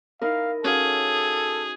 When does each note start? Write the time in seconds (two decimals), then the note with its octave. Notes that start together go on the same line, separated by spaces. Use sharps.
0.21 D#4 E4 A#4 F5
0.64 C#4 F#4 G#4 A4 F5